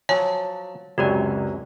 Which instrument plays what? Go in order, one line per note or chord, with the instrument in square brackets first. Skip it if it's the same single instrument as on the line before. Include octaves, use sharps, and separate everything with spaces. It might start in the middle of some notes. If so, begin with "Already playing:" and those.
[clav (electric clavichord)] F3 F#3 [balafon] C#5 G#5 [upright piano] A5
[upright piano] C#2 [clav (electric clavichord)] F#2 C3 F#3 [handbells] F#4 G4 D5